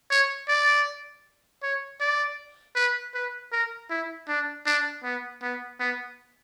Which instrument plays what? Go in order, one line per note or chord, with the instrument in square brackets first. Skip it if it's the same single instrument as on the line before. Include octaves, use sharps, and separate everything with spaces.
[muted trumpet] C#5
D5
C#5
D5
B4
B4
A#4
E4
D4
D4
B3
B3
B3